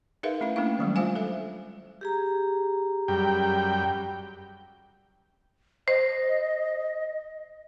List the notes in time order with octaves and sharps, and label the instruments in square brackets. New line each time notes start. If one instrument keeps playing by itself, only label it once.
[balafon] D#4 G#4 A#4 B4 E5 F5
A3 C#4 E4 F5
A3 A#3 C#4 D4 E4 F5
D#3 F#3 G3
G#3 F4 C5 F5 G#5
A4 E5
[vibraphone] G4 G#4 A#5
[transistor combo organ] F#2 G3 G5
[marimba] C5 [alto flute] D#5